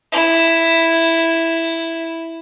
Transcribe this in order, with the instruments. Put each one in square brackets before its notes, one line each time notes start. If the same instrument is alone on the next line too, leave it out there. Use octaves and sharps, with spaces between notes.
[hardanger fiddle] E4